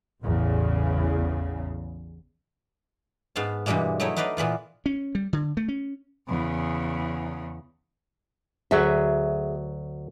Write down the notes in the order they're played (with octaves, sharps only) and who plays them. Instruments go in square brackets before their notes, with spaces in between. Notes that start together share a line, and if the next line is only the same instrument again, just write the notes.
[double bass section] A1 E2 C#3
[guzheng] G#2 B3 F5 A5
G2 B2 E3 G3 G#3 A#3
F#3 A3 D#4 E4 C#5
D#4 F#4 B4 D5 D#5 F5
A#2 E3 B3 F4
[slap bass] C#4
G3
D3
A3
C#4
[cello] E2 C#3
[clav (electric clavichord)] D2 F#3 [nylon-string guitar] G#4 E5